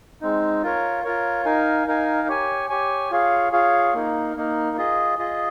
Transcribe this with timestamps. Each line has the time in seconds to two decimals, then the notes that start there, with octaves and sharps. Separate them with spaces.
0.21 G#3 C4 D#4
0.63 F4 A#4 C#5
1.04 F4 A#4 C#5
1.45 D#4 A#4 F5 G#5
1.87 D#4 A#4 F5 G#5
2.28 G4 C#5 G#5
2.70 G4 C#5 G#5
3.11 F4 G#4 C#5 F5
3.52 F4 G#4 C#5 F5
3.94 A#3 D#4 A#4
4.36 A#3 D#4 A#4
4.77 F4 G#4 D#5
5.19 F4 G#4 D#5